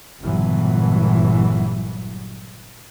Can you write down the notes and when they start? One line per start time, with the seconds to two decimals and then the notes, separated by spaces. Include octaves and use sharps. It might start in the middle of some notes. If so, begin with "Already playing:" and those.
0.20 G1 C#2 A#2 E3 F#3